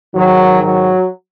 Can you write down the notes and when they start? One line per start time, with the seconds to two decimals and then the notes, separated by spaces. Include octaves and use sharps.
0.13 G#2 D#3 F#3
0.62 F#3